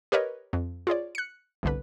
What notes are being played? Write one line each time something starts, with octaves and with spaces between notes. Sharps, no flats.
G4 A#4 B4 C#5 D#5
F2
F4 G#4 C#5 D5
F#6 C#7
G1 C2 D3 B4